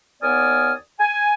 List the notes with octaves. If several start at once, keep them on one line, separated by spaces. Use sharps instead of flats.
D#2 B3 D5 G#5 D#6 F6
G#5